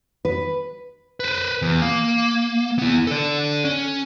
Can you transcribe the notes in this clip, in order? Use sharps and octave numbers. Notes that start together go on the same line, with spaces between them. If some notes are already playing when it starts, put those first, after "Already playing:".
B4
B4 C5
E2
A#3
B3 E4
A4 D5
C#4